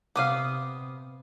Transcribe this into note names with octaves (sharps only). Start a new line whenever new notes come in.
C3 B3 F5 D6 D#6